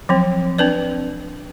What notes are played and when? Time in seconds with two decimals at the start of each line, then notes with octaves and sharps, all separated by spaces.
0.09 F3 F#3 C4
0.58 C4 D4 B4 D5